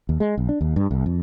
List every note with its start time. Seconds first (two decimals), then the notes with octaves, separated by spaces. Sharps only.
0.09 D#2
0.20 G#3
0.38 B1
0.49 D4
0.61 D#2
0.76 G2
0.91 C2
1.06 F2